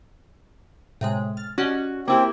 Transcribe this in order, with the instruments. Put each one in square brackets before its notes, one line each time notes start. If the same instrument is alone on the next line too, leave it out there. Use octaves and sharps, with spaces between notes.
[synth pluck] A2 C3 G#3
F6 A6
[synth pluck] C#4 D5 D#5 [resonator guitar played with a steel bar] F#4
[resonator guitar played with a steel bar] A#3 E4 G4 [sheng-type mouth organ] C4